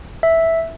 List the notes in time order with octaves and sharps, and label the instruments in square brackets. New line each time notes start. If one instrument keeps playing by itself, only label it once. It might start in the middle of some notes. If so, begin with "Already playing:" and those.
[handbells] E5